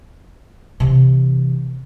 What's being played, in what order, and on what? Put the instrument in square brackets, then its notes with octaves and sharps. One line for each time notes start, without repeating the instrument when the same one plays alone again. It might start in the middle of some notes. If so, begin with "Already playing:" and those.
[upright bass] C3 E3